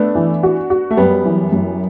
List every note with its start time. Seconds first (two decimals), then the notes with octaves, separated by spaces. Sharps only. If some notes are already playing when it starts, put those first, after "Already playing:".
Already playing: A3 B3 D4
0.15 E3
0.43 F#4
0.70 F#4
0.91 A3
0.97 F#2 G3 B3
1.25 E3
1.52 F#2